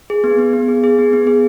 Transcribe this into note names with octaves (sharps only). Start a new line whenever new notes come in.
G#4
B3
B3
B3
G#4
G#4
B3
B3
G#4